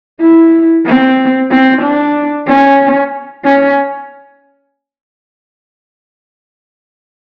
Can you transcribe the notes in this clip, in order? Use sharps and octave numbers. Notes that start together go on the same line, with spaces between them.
E4
C4
C4
D4
C#4
C#4